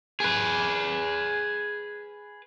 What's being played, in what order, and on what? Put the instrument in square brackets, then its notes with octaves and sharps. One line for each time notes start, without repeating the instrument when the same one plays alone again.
[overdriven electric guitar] G#4 B4